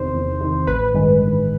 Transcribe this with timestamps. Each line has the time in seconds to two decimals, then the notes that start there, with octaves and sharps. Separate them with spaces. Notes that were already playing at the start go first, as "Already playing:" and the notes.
Already playing: E2 C3 D#3 C5
0.14 E2
0.41 C3 D#3
0.67 A1 B4
0.94 G2 D#3 G#3
1.21 A1